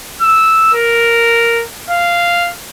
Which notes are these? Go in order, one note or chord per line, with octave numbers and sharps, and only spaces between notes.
E6
A#4
F5